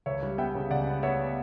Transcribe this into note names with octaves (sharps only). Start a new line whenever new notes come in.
C#2 C#5 E5
G3
B3 E5 G5
C#3
C#2 D5 F#5
B3
B3 C#5 E5